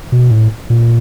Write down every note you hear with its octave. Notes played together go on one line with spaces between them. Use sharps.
B2
A2
A#2